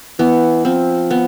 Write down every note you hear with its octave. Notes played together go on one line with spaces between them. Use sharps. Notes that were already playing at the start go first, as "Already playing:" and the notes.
E3 B3
F3 C4
B3